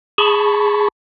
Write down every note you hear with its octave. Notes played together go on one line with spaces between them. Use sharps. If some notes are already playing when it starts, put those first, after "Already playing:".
G#4 A5 B5 C#6